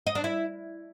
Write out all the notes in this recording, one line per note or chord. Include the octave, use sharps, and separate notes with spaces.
D#5
D4
E4